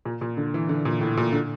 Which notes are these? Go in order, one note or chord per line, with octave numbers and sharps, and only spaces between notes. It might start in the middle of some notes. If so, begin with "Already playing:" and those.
A#2
A#2
D3
E3
D3
A#2
A2
A#2
D3